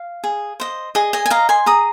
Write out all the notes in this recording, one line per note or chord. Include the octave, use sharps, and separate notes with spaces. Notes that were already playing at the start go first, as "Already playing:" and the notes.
Already playing: F5
G#4
C5 D#5
G#4 D#5
D#5 G#5
G#5
D#5 F5 A#5
G#5 C6
G#4 A#5 D#6